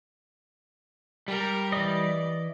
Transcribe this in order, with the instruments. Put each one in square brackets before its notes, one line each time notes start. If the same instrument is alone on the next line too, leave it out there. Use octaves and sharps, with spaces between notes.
[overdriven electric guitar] G3 [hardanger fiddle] A#4
[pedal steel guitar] E3 D#5 [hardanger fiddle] D5